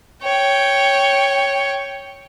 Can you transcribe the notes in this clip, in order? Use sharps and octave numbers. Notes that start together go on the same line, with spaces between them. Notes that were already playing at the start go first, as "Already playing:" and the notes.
C#5 G5